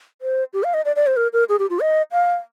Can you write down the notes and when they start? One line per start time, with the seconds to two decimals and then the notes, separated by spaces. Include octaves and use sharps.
0.22 C5
0.53 G4
0.64 F5
0.74 D#5
0.85 D5
0.96 D5
1.07 C5
1.17 A#4
1.33 A#4
1.49 G#4
1.59 G4
1.70 F4
1.80 D#5
2.12 F5